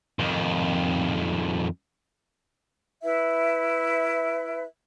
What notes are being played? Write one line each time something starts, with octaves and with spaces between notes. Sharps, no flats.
F2 D#3
E4 B4 E5